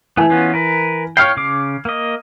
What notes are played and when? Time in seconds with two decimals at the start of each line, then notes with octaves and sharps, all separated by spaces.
0.17 E3 A3 B3 G#5
0.30 B3 C#4 F4
0.54 A#4 B4
1.17 C#5 F5 G5 F6 G#6 C7
1.37 C#3 D6
1.85 A#3 D#5